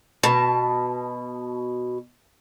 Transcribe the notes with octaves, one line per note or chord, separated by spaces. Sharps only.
B2 A5